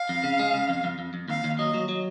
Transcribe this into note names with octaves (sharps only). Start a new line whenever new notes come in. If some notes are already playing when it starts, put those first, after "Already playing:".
Already playing: F5
F2
C#3
G#3
C#3
F2
F2
F2
F2
D#2 F5
D#2
F#3 D#5
F#3
F#3